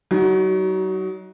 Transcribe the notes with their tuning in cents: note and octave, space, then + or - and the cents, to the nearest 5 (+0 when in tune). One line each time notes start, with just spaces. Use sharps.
F#3 +35 D#4 +25 F#4 +0